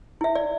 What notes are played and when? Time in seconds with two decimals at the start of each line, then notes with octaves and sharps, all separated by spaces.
0.21 E4 E5
0.35 D5